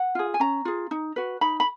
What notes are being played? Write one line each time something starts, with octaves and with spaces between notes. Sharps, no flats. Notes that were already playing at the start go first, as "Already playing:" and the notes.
Already playing: F#5
F4 G#4
G#5
C#4 A#5
F4 G#4
D#4
F#4 B4
D#4 B5
B5